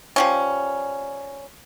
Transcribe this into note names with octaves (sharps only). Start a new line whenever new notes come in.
F3 G3 C#4